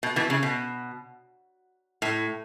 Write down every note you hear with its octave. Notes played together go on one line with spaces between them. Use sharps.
B2
B2 E3
C#3
B2
A2